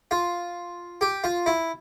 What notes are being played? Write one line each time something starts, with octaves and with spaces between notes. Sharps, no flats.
F4
G4
F4
E4